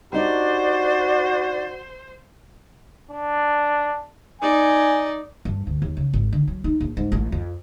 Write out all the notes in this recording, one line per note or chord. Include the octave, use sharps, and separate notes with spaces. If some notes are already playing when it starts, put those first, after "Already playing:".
D4 D#4 F#4 G4 C5 D5
D4
D#4 D5 G#5
G2
D2
D#2
C#3
G#1
D3
F#3
D#4
A#1
G#2
A1
F2